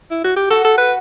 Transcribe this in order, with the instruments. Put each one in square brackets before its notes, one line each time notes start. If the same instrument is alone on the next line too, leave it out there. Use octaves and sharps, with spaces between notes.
[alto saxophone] E4
F#4
G4
[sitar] F#4 [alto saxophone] A4
[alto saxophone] A4
B4